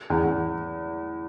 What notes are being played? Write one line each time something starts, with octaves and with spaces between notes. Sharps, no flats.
E2
E2